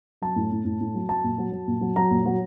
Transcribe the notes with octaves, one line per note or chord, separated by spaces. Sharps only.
F#3 A5
A2
A2
A2
A2
F#3
F#3 A5
A#2
F#3
F#3
A#2
F#3
F#3 A#5
A#2
F#3